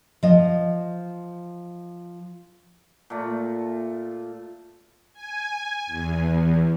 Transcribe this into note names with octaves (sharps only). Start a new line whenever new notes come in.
F3 D#5
A#2 A3
G#5
E2